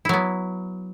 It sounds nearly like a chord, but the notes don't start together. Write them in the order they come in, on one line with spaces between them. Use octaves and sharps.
E4 F#3 B3